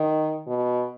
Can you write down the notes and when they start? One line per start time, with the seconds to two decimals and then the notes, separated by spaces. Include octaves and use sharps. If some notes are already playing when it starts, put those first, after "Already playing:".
Already playing: D#3
0.47 B2